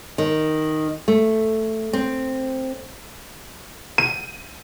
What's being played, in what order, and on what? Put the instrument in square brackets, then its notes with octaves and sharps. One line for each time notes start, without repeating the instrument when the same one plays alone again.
[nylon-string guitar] D#3
A3
C4
[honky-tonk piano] D#7